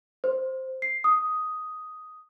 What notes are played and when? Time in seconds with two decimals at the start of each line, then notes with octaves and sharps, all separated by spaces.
0.24 C5
0.82 C7
1.04 D#6